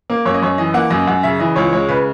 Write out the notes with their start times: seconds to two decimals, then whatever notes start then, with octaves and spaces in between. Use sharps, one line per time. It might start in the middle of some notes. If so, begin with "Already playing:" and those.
0.10 A#3
0.25 F#2 C#5
0.34 D#5
0.42 F#2 C#5
0.58 E3 D#5
0.74 A#3 F#5
0.90 F#2 D#5
1.07 F#2 F#5
1.23 C#3 E5
1.40 E3 D#5
1.56 C#2 C#5
1.73 G#3 C#5
1.89 C#3 B4